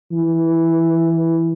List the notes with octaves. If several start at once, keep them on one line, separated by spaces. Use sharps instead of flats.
E3